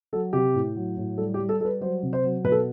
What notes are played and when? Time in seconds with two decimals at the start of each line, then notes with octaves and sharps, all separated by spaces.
0.13 F#3 A4
0.33 C3 G4
0.54 A2
0.75 F#3
0.97 A2
1.18 G3 A4
1.34 G4
1.39 G3
1.49 A4
1.60 G3 A4
1.65 B4
1.81 F#3 C5
2.03 C3
2.13 C5
2.24 F#3
2.44 B2 B4
2.52 A4